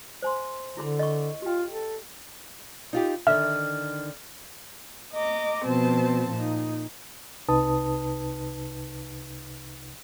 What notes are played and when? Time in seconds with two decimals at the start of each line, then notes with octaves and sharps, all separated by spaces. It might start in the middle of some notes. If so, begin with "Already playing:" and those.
0.22 C5 G#5 C6
0.77 D3 E4 G#4 B5
0.99 D#5 C#6
1.42 F4 G4 G5
1.69 A4
2.93 D#4 F4 G4
3.27 D3 D#3 E5 F6
5.13 D#5 A#5 D6
5.66 B2 F3 C4 C5 A5
6.31 A#2 D#4
7.49 C2 C3 D#4 B4 A5 D#6